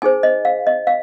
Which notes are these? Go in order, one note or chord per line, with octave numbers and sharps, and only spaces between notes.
D#4 G#4 C5 G#5
D#5
F5
D#5
F5